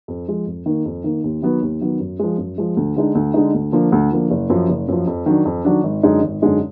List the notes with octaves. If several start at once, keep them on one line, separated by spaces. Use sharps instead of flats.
F2
F3 G#3
F2
D#3 A#3
F2
D#3 A#3
D#2
D#3 F#3 B3
D#2
D#3 F#3 B3
F#2
F3 G#3
F#2
F3 G#3
D2
D3 G#3 D#4
D2
D3 G#3 D#4
D2
D3 F3 A#3
D2
D3 F3 A#3
F#1
F#2 F3
F#1
F#2 F3
F2
D#3 F#3 D4
F2
D#3 F#3 D4
G#1
F#2 D3 G#3 D#4
G#1
F#2 D3 G#3 D#4